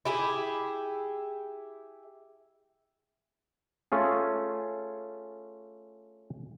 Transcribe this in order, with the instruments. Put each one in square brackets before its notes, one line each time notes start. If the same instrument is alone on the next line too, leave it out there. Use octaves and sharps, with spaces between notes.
[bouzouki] E4 G4 G#4
[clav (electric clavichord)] A3 C#4 F4 G#4